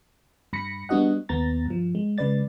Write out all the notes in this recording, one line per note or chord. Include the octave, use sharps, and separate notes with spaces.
G2 B5 A#6 C#7
G3 B3 D4 F#4 D#5 F#5
D#2 B3 A#5 A6
G2 F3
G#3
C#3 G#3 B4 D5 A6